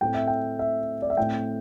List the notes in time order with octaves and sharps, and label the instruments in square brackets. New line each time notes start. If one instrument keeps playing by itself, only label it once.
[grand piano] A2 A3 C4 G5
E5
G5
E5
D5
E5
A2 A3 C4 G5